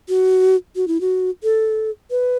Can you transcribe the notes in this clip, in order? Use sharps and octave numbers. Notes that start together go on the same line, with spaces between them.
F#4
F#4
E4
F#4
A4
B4